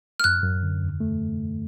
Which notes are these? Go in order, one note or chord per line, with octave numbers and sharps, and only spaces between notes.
F6
F#2 F#6
F#2
D3
E2
A3